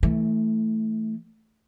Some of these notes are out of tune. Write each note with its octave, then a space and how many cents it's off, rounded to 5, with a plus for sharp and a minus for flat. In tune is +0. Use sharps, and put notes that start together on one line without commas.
E3 -20 A3 +0